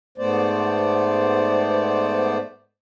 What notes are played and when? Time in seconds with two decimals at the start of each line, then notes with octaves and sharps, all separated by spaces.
0.18 G#2 A3 B3 C5 D5